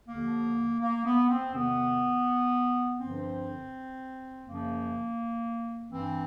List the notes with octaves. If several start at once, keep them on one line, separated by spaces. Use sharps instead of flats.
D#2 D3 F3 A#3
A#3
B3
C4
E2 C3 D#3 B3
G2 D3 F3 C4
F#2 C#3 F3 A#3
G2 E3 C4